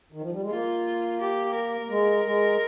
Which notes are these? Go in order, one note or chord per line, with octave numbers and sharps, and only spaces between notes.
D#3
F3
G3
G#3
A#3 F4
G4
A#4
G#3
G#3